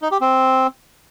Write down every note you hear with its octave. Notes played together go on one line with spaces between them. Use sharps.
D#4
G4
C4